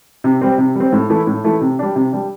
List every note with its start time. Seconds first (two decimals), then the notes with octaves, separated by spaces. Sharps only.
0.24 C3
0.41 G3 C4
0.58 C3
0.75 G3 C4
0.93 A2
1.10 E3 A3 E4
1.27 A2
1.44 E3 A3 E4
1.61 C3
1.79 G3 D4
1.96 C3
2.13 G3 D4